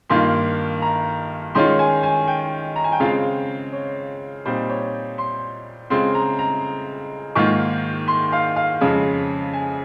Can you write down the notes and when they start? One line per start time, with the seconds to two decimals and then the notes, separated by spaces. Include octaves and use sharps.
0.10 G2 D#3 A#3 F4 C6
0.82 A#5
1.55 D#3 G#3 C#4 F4 C6
1.79 G#5
2.03 G#5
2.27 G5
2.76 A#5
2.84 G#5
2.92 G5
3.00 C#3 G#3 C4 F4 F5
3.73 C#5
4.45 A#2 G3 C4 D#4 C5
4.69 C#5
5.18 C6
5.90 C#3 G#3 C4 F4 C6
6.15 A#5
6.39 A#5
7.35 G#2 D#3 A#3 F4 C#6
8.08 C6
8.32 F5
8.56 F5
8.81 F2 C#3 G#3
9.53 G#5